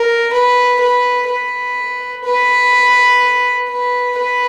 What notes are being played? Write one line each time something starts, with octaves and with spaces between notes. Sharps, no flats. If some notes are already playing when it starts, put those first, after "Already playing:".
Already playing: A#4
B4
B4
B4
B4
B4
B4